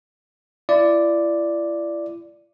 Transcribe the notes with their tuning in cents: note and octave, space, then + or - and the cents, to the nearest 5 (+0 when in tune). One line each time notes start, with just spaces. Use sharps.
E4 +40 D5 +0